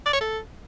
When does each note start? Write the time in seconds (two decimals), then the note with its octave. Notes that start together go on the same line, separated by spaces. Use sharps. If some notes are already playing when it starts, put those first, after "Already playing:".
0.06 D5
0.13 C#5
0.21 A4